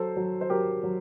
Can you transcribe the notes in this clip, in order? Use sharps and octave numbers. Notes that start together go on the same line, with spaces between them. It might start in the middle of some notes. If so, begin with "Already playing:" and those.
Already playing: F#3 A4 C5
F#3
C5
F#3 G4 A#4
F#3